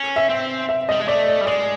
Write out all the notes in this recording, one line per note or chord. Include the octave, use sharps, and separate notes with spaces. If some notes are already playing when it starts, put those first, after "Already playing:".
Already playing: C#4
E5
C4
E5
G3 D#5
G#3
A3 D5
D5
G3
G#3 D5